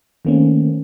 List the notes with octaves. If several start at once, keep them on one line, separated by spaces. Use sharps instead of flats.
D#3 A3 A#3 C4 C#4